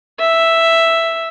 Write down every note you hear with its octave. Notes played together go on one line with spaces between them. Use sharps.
E5